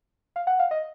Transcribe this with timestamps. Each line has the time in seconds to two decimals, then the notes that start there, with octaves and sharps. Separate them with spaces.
0.36 F5
0.47 F#5
0.59 F5
0.71 D#5